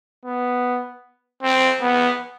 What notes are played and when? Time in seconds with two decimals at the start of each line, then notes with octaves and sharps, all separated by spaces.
0.25 B3
1.43 C4
1.82 B3